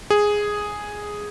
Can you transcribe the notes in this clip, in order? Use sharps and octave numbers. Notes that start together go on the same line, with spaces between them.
G#4